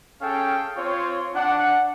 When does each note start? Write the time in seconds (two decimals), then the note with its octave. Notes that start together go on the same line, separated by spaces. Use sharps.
0.22 C#4 G#4 A4 F5 G5
0.77 C4 F4 C5 C#5
1.36 D4 F#5